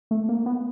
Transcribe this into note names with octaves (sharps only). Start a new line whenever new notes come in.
A3
A#3
B3